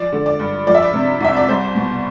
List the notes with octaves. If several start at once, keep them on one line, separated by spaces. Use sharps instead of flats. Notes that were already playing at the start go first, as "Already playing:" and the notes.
Already playing: F3 D5
D3
D5
G2
F3 D5
E5
D5
C3
C2 E5
D5
G3 C5
B2